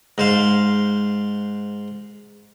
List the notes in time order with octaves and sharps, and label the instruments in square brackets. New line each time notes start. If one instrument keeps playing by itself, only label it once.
[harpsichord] G#2 C5 F5